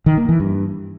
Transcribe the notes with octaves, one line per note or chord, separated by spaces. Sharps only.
D#3
A#3
E3
G2